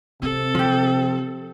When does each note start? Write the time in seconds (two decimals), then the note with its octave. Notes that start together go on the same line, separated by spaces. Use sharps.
0.22 C3 C4 A4
0.55 F3 G4